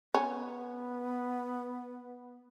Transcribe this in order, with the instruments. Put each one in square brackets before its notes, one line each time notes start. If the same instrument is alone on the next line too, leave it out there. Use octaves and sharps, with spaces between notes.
[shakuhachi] B3 [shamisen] C#4